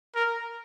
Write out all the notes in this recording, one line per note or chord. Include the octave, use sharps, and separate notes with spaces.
A#4